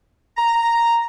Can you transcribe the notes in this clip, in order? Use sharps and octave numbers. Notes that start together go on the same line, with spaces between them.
A#5